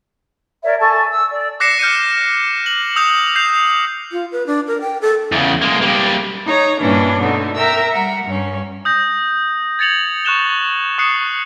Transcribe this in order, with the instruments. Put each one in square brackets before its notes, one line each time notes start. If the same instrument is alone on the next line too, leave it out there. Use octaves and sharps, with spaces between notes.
[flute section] A#4 C#5 D5 E5
A4 G#5 A5 C#6
E6
D5
[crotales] D6 F#6 A#6 C7 C#7 E7
F6 G6 C7 C#7 D#7
F#7
D#6 E6 G6 F7 F#7
G6 C7 F7
[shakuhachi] F4
B4
D4
A#4
G5
A4
[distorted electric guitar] E2 C#3
G#3 A#3
G3 A#3
[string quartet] D#4 C#5 A#5
G2 A#2 E3 C#4 D4
B2 D3 A3 D#4
A#4 E5 G5 A#5 E6
G3 A#4 F#5
G2 C#4
[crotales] D#6 G6 A#6
G#6 A6 C#7 F7 F#7
C#6 F#6 E7 G7
C#6 D#6 F#6 C7 C#7 E7